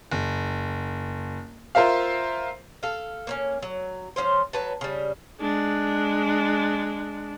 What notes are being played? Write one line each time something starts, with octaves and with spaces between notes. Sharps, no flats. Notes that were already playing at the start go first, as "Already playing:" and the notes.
F#1
F4 A#4 C5 E5 F5
A4 F5
A#3 C4 C#4
F#3
F3 G#3 C#4 C5
F#3 B4 A5
C#3 G3
G#3 D4